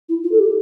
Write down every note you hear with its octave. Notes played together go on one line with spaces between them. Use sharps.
E4
F4
A4
G4